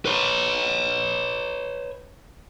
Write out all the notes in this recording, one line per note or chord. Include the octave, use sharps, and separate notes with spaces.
B4 C#5